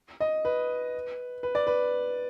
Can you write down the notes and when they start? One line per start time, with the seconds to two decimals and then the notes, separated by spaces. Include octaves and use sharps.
0.20 D#5
0.45 B4
1.43 B4
1.55 D5
1.67 B4